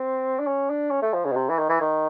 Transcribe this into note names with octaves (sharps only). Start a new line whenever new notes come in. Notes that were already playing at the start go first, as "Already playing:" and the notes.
Already playing: C4
D4
C#4
D4
C#4
A3
F3
C#3
B2
C3
E3
D#3
E3
D#3